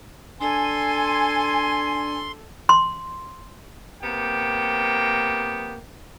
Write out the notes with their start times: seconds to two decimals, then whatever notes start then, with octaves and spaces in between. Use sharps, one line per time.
0.41 D4 A4 G#5 C6
2.69 C6
4.03 C3 A#3 B3 G5